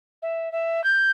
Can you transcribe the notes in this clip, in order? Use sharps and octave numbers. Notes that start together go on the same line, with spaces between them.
E5
E5
G6